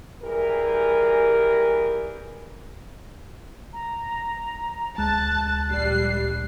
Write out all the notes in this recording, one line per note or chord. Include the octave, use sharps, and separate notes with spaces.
E3 G3 G4 G#4 A#4
A#5
D2 G#3 A5 F#6
A#1 G3 C7